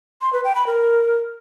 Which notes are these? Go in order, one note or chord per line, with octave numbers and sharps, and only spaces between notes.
C6
B4
G5
B5
A#4